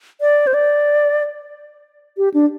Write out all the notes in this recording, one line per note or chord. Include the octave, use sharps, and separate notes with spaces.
D5
C5
D5
G4
D4